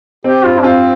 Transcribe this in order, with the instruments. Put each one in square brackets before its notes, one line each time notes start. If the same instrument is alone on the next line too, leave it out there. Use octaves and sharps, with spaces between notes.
[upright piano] C4 [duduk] G4
[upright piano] G2 [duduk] F4
[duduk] D4
[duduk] C4 [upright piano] F4